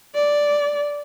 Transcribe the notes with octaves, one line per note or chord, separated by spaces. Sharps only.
D5